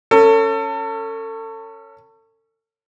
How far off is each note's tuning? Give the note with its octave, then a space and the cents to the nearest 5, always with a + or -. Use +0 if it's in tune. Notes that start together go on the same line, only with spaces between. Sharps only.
C#4 +0 A4 +35